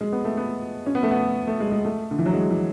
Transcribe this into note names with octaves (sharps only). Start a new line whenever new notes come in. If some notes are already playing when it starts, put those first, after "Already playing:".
G#3
B3
A3
B3
C#4
B3
A3
B3
A3
G#3
G#3
A3
D3
E3
F#3
G#3
E3